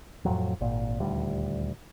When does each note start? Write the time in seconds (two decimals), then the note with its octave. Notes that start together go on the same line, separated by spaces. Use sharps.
0.25 F2 A2 F3 F#3
0.61 G#1 A#2
1.00 D#1 D2 G3